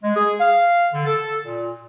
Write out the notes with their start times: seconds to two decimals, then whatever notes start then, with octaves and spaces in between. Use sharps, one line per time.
0.03 G#3
0.16 G#4
0.40 F5
0.94 D3
1.05 A4
1.45 A#2